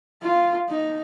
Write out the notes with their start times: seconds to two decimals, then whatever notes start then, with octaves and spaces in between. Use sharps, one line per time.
0.22 F4
0.69 D#4